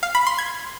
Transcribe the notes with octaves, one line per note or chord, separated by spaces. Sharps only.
F5
B5
C6
G#6